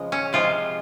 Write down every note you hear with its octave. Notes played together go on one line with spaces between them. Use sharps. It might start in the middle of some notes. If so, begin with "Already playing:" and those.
Already playing: C#3 F3 G#3
C#4
C3 F3 G#3 F4